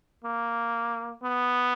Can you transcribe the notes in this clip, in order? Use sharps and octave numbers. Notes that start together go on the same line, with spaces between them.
A#3
B3